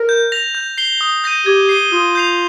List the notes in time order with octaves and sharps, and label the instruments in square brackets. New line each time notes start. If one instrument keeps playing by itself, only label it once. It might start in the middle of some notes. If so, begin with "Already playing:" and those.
Already playing: [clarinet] A#4
[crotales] G6
A#6 F7
G6
C7 G7
D#6
G6 A#6 D#7
[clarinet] G4 [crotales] G#6
[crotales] C7 D#7 G7
[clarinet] F4 [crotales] D#6
[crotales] G6 C7 F7